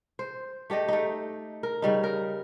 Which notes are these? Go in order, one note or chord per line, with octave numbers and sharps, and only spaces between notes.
C5
A3 G4 D5 D#5
A3 D#4
A#4
C#3 G3 D#4
A#4